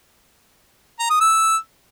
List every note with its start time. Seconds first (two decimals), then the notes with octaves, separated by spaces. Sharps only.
1.00 A#5
1.10 D#6
1.21 E6